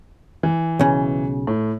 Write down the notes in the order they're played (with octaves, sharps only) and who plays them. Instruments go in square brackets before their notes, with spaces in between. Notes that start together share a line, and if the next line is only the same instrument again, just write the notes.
[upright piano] E3
[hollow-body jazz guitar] B1 C#3
[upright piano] A2